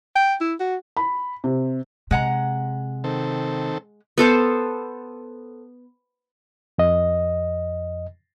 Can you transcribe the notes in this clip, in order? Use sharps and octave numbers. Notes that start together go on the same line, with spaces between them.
G5
E4
F#4
B5
C3
C3 G#3 F#5 A#5
D#3 C4 A4
B3 A4 C5 A5
F2 D#5